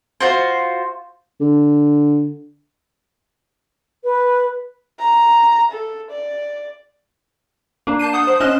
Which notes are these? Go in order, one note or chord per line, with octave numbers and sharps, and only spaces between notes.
F4 F#4 C5
D3
B4
A#5
A4
D5
A#3 D4
A5 G6 C7 D#7
F#5 D#6 G6
C5 D#6
C#4 D#5 C6 F#6 E7